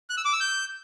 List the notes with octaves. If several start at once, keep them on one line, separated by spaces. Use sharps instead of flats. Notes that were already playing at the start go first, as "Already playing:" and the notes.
F#6
E6
D6
E6
G6